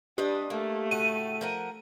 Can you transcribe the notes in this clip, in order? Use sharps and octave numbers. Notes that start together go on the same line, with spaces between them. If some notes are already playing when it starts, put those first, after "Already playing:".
G3 D4 G4 B4 D#5
A3 A#3
A2 C#3 F#4 D#7
F3 A#4 F#5